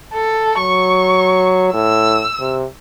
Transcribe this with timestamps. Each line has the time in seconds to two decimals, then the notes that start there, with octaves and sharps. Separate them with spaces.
0.13 A4
0.58 F#3 C#6
1.74 A2 E6
2.40 C3